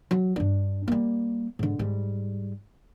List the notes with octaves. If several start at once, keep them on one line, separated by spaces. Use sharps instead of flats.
F#3
G2 D4
G3 A#3
G#2 D3
G#2 G3